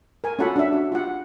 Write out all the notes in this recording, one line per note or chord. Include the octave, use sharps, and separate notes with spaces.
A#4 G#5
C#4 F4 F#4 A4 F#5 B5
D4 E5
F#4
F4 G4 F#5